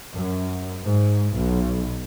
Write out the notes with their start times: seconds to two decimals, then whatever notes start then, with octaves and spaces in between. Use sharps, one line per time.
0.13 F#2
0.83 G#2
1.36 B1